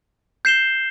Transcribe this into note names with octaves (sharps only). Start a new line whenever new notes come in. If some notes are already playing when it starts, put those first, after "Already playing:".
G6 C7 E7 G7